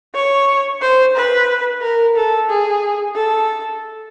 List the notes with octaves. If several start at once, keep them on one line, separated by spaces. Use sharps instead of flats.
C#5
C5
B4
A#4
A4
G#4
A4